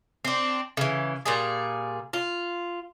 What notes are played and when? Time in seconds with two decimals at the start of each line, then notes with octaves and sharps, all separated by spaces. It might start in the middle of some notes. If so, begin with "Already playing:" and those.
0.25 C4 D4
0.77 C#3 E3
1.26 A#2 G3 G#4
2.13 F4